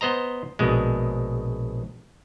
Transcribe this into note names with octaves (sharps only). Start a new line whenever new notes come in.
B3 C5 D#5 A#5
A#1 B2 G#3